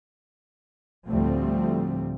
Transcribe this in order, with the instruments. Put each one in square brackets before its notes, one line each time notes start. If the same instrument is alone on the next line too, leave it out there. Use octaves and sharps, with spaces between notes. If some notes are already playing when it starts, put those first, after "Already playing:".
[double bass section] D2 A2 F3 G3 A3 C4